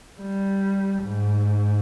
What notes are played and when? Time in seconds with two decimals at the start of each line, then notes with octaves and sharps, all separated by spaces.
0.21 G3
1.04 G#2